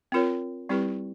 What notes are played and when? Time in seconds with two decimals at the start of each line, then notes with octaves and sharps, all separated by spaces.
0.12 C4 F4 A#4 C#5
0.69 G3 C4 E4 G4 B4